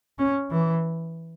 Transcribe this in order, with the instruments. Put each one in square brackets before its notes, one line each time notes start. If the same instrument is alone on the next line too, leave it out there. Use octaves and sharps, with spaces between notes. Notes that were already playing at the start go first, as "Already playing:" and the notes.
[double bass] C#4
E3